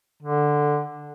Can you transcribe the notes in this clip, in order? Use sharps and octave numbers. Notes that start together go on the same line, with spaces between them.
D3